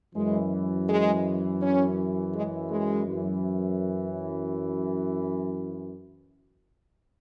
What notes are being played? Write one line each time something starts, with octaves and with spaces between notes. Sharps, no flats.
F#2 E3 G#3
G#3
C#4
G#3
G#3
F#2 E3